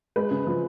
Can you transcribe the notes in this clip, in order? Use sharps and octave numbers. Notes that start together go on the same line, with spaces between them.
G#3 B4
C#3
F3